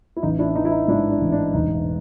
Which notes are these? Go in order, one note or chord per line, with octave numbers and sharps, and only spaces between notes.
E4
A1 D#4
D4 E4
D4
E3 D#4
E4
D#4
G#2 D4 E4
D4
A1
D4
E1 D#4